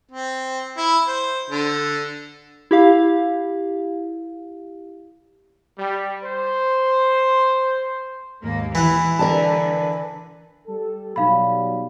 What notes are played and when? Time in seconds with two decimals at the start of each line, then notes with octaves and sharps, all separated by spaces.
0.11 C4
0.77 E4
1.07 C5
1.50 D3
2.71 E4 G4 F5
5.78 G3
6.24 C5
8.41 D#2 G#2 A#3
8.75 E3 E4 F#5
9.19 D3 A#4 B4 D5 A5
10.67 G3 A4
11.16 B2 F#3 G3 D#4 F5 B5